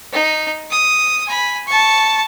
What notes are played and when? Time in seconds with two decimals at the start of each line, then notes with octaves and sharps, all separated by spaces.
0.13 D#4
0.71 D#6
1.26 G#5 B5
1.67 A5 C#6